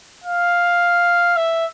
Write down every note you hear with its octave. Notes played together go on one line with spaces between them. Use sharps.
F5
E5